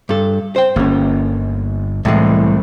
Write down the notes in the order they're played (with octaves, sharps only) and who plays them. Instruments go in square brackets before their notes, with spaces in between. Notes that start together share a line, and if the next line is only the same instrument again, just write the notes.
[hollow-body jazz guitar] G2 A4
C5 G5
[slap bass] G1 [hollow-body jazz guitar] A#3 C#4
[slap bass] C2 [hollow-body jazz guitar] A2 E3 G#3